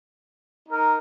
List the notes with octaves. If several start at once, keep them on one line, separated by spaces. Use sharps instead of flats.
D#4 A#4